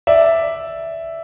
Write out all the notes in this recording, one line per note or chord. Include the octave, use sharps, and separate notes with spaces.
D5 E5